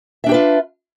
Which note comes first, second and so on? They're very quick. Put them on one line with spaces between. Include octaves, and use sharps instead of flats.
E5 D4 G4 B4 F4